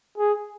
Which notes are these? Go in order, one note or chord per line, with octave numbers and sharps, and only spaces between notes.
G#4